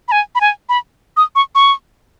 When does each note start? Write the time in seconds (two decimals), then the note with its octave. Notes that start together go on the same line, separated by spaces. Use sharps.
0.08 B5
0.12 G#5
0.35 B5
0.41 G#5
0.69 B5
1.17 D#6
1.35 C#6
1.55 C#6